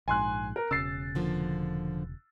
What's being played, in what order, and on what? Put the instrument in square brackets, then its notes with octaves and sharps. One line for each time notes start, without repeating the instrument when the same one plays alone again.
[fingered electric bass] A#1 G#2 [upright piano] G#5 C6 F#6
[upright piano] A#4
[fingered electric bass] E1 C#3 [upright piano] E6 A6 C7
[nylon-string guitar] D3 F3 A#3